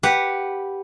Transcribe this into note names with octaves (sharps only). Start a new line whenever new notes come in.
G4 B4 F#5